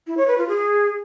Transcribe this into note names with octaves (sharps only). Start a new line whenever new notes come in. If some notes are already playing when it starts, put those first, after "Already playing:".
E4
C#5
B4
F4
G#4